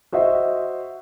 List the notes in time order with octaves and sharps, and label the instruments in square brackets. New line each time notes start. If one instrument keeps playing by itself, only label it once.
[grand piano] F#4 C5 D#5 E5